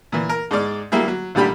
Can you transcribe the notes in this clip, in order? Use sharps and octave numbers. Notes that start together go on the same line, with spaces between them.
A#2 E3
A#4
G#2 G#3 D5 F6
F#3 G3 A#3 E4 G#4
F#3
A1 A#2 D3 G3 G4 B5